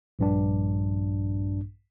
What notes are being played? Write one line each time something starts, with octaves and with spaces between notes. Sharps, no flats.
A#1 G2 D4